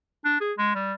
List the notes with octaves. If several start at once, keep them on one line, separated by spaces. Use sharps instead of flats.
D4
G#4
G#3
G3